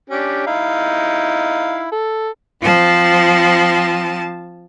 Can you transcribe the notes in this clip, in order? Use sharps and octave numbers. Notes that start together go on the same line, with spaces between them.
C#4 D4 G4
D#4 E4 F5
A4
F3 C4 A5